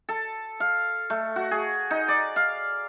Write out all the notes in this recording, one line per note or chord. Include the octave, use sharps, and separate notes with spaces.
A4
F5
A3
F#4
G#4
D#4
D5
F5